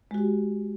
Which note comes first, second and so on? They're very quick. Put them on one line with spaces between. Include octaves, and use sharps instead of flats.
G#3 F#4 G4